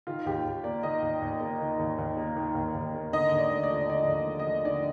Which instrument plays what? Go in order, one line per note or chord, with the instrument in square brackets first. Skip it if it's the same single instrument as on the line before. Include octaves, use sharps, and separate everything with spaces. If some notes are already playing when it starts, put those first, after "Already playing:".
[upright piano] D#3 F4
D#2 G4
D#2
A#3 D5
D#3 D#5
D#2
D#2
A#3
D#3
D#2
D#2
A#3
D#3
D#2
D#2
A#3
D3 D#5
D#2
D5
A3
D5
F3
D3 D5
D#2
D#5
A3
D#5
F3
D3 D5